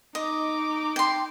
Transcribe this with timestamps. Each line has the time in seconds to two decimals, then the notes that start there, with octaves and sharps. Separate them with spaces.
0.15 D#4 D#5 D6
0.96 G5 C6